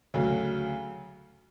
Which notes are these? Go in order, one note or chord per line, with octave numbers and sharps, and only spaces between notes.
D2 C#3 F#3